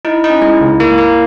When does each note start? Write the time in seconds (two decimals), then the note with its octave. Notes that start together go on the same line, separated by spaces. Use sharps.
0.05 D#4 E4
0.24 D#4
0.30 C#4
0.42 G#3 E4
0.61 C#2
0.80 A#3 E4
0.98 A#3